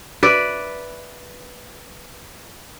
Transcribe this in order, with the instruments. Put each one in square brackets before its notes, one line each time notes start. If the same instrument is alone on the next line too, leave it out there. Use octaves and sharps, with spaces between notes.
[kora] B4 D5 E5